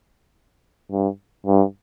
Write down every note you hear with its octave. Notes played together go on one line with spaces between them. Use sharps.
G2
G2